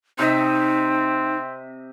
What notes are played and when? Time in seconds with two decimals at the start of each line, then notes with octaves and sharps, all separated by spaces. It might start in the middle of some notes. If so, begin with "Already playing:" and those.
0.19 C3 C4 D#4 D#5 E5